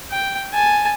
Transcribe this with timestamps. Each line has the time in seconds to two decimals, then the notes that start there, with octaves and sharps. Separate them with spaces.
0.11 G5
0.53 G#5 A5